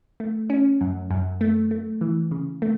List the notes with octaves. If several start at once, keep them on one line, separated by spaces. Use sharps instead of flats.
A3
C#4
F#2
F#2
A3
A3
E3
C#3
A3